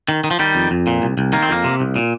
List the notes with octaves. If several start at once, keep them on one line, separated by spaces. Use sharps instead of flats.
D#3
D#3
F3
D#3 G3
F2
F2
A#2
C2
C2
D#3 A#3
C4
F2 A#3
C3
C2
A#2